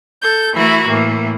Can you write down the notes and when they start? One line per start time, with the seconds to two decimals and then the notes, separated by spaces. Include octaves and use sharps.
0.21 A4 G6
0.54 E3 A3 E4 F#4 A#4
0.88 A2 E3 A#3